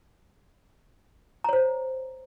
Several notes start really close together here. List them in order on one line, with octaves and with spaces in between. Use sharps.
A#5 C#5 C5